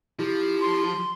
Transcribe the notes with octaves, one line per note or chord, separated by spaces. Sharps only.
F3 E4 G4
C6